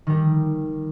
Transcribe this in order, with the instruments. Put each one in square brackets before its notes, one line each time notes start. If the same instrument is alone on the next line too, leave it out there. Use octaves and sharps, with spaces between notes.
[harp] D#3 G3